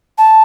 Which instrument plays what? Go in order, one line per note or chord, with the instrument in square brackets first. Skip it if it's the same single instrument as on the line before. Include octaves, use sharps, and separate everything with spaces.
[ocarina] A5